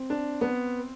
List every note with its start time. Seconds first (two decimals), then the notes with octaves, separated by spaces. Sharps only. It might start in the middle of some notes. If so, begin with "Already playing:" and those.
Already playing: C4
0.10 D4
0.41 B3